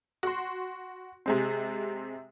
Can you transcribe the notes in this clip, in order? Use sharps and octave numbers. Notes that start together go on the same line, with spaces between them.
F#4 C6
C3 G#3 C4